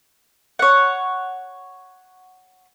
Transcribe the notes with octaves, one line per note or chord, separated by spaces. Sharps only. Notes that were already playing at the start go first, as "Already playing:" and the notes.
C#5 F#5